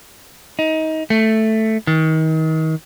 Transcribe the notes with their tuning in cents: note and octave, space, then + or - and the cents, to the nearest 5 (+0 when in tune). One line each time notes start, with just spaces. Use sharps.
D#4 +25
A3 +0
D#3 +35